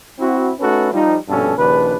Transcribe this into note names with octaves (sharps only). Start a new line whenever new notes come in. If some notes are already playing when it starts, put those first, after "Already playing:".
C4 E4 F#4
A3 C#4 D#4 F#4 A4 B4
F3 G3 D#4
A#1 G2 B2 C#4 A4
A#1 D#2 C#3 D4 B4